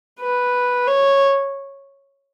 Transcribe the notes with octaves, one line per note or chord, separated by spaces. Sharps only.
B4
C#5